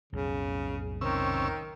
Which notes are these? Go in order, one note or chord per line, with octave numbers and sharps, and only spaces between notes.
B1 F2 A2 C#3
C3 D#3 C#4 E6